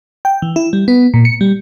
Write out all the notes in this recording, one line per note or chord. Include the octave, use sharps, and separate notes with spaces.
G5
E3
E4
G3
B3
A#2
C#7
G3